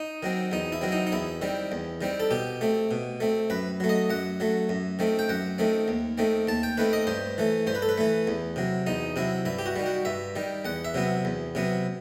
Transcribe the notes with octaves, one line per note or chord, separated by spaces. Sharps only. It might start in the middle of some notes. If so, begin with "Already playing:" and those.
Already playing: D#4
D#3 F#3 C4
E2 D#4
E4
D#3 F#3 C4
D#4
D#4
E2 E4
D#3 G3 C4
E2
D#3 G3 C4
A4
B2 G4
A3 C4
B2
A3 C4
F#2 B4
F#3 A3
D#5
F#2 F#5
F#3 A3
F#2
D#3 A3 C4
G5
F#2 F#5
D#3 A3 C4
D#2
D#3 A3 C4
D#2 A5
G5
D#3 A3 C4 B4
D#5
G2 C5
E3 A3
G2 C5
B4
A4
B4
E3 A3
E2
C3 F#3
E2 D#4
C3 F#3 E4
G2 E4
G4
F#4
D#3 G3
F#4
G2 E5
D#3 G3
E2 F#5
E5
C3 F#3 B3
E2
C3 F#3 B3